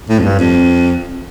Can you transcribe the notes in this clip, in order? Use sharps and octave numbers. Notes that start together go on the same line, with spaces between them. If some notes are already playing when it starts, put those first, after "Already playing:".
A2
F2
G2
F2